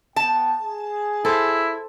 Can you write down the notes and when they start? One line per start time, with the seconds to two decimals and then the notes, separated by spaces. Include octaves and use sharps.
0.16 B3 G5 A5
0.61 G#4
1.25 E4 A4 C5